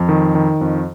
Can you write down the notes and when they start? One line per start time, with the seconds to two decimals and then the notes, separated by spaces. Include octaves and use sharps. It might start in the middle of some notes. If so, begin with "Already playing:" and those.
Already playing: F2
0.09 D#3
0.35 D#3
0.61 F2